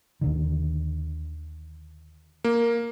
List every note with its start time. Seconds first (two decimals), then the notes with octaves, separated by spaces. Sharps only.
0.21 D#2 D3 D#3
2.44 A#3